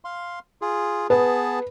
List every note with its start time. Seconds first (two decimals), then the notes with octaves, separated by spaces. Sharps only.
0.04 F5 C6
0.61 F4 G#4
1.10 B3 G#4 B4 A5